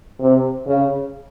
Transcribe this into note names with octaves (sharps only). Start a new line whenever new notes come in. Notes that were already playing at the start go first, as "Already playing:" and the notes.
C3
C#3